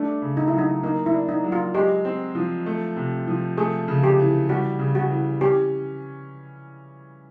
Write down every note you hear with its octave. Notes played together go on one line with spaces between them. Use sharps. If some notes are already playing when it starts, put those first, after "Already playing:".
Already playing: A3 D4
C#3
D#4
E4
F#3
D#4
A#3 D#4
E4
D4
D#4
F#3
F4
G#3 G4
C4
F3
A3
C3
F3
A3 G#4
C#3
G4
E3
G3 F#4
C#3
F#4
E3
C#4 G4